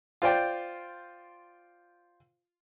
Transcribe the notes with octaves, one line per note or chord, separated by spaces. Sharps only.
F4 C5 D5 G5